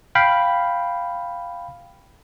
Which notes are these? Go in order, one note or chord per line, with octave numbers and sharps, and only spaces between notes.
F5 G5 B5